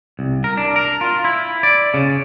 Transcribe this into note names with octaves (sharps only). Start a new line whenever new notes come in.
C2
A#4
D4
A#4
F4
E4
D5
C#3